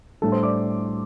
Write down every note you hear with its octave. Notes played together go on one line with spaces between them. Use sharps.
A2 G3 D4 A4 A5
C5 C6
D5 D6